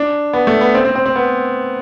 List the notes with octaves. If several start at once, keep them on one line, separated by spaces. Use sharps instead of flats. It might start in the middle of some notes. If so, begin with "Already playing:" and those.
Already playing: D4
B3
A3
B3
C4
C4
C4
C4
B3